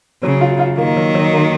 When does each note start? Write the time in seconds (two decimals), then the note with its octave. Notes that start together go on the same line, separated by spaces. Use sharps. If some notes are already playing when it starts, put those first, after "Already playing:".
0.23 C#3 F#3
0.41 F4
0.59 F4
0.78 D#3 A#3
0.97 F#3
1.15 F#3
1.33 A#3